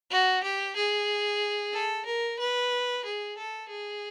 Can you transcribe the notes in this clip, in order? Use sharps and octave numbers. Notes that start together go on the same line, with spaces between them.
F#4
G4
G#4
A4
A#4
B4
G#4
A4
G#4